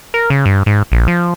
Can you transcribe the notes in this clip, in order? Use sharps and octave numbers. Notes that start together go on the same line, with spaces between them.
A#4
C#3
G2
G#2
A#1
F3